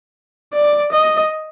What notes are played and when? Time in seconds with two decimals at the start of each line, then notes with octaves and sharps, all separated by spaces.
0.54 D5
0.92 D#5